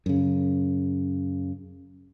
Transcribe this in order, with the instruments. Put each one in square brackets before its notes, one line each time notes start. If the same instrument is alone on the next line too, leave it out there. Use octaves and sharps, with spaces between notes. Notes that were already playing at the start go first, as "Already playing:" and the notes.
[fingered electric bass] F#2 C#3